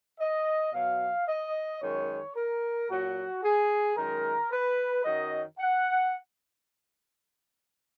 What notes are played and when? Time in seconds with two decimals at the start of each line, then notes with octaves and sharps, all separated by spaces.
0.20 D#5
0.73 B2 F#3 F5
1.28 D#5
1.81 F#2 D#3 G#3 C#5
2.36 A#4
2.89 A#2 F#3 F#4
3.44 G#4
3.97 F#2 D#3 G#3 A#4
4.51 B4
5.04 F#2 D#3 F#3 D#5
5.59 F#5